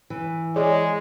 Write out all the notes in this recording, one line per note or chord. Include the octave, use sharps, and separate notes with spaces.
E3
G#3 G#4 C#5 D5